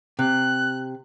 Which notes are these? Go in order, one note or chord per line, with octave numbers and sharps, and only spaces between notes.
C3 F#6